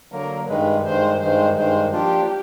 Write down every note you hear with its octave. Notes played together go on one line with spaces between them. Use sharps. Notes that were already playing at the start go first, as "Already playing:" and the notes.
D3 F#3 A#3 A#4
G2 D#3 G#3 B4
G2 D#3 G#3 C5
G2 D#3 G#3 C5
G2 D#3 G#3 C5
F3 A#3 D4 F4 G4